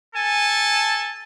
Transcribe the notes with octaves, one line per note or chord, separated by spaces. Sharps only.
A4 G#5 A5